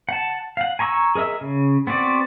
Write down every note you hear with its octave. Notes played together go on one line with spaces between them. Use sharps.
F#5 A5
F5 F#5
G#5 A#5 C#6 D#6 E6
G#4 A#4 D#5 E5
C#3
B3 C4 F#4 D5